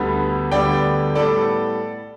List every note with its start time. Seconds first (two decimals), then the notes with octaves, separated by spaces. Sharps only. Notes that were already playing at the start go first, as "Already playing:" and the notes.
Already playing: D2 D3 G3 B3
0.51 D2 D3 G3 B3 D5 G5
1.15 A2 G3 B3 A4 D5